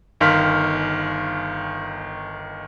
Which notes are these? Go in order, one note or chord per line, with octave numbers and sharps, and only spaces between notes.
G1 D#3 F5 C6 F6 B6